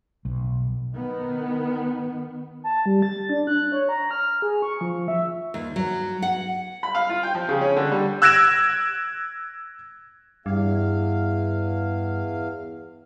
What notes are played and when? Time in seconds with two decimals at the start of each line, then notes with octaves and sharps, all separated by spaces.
0.25 B1
0.94 D#3 B3
2.64 A5
2.86 G3
3.02 A6
3.29 D4
3.47 F#6
3.72 C#5
3.89 A#5
4.11 F6
4.42 G#4
4.62 C#6
4.81 F3
5.08 E5
5.54 D#2
5.76 F#3
6.22 F#5
6.83 B5
6.95 F5
7.09 F4
7.23 G5
7.35 F3
7.49 C#3
7.61 C#4
7.76 D3
7.92 G3
8.22 E6 F#6 G#6 A#6 D7 E7
10.46 E2 G2 F5